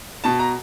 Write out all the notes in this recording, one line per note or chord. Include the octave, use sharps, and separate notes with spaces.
B2 A5
A#5